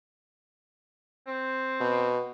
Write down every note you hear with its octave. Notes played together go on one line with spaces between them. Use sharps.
C4
B2